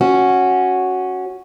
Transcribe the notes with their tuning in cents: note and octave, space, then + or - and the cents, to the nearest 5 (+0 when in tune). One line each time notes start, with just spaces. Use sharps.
C#4 -5 F#4 +0